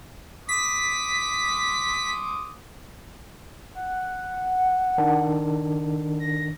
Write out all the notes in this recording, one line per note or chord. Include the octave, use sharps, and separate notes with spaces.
C6 D6 D#6 B6
F#5
D#3 D4
A#6